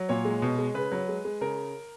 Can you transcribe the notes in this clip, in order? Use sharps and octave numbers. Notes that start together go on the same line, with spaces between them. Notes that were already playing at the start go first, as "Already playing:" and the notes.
Already playing: F#3
A#2 C#5
G#3
B2
G#3
C#3 B4
F#3
G#3
G#3
C#3 A#4